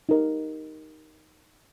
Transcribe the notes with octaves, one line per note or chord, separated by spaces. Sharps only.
D#4 G4 A#4 D#5